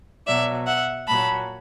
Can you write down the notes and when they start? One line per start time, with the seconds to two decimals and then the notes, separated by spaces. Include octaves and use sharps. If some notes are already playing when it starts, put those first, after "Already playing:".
0.27 B2 F#3 D5 E5
0.67 E5 F#5
1.07 A#2 F#3 A5 B5